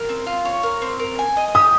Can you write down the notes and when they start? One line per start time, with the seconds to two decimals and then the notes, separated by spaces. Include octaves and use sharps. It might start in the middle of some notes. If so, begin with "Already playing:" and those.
Already playing: A#4
0.09 C4
0.27 F4
0.45 C#5
0.63 A#4
0.82 C4
0.99 A#4
1.19 G#5
1.37 D#5
1.55 G4 D#6